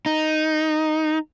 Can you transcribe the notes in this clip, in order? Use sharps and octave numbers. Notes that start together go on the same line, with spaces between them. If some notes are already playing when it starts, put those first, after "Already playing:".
D#4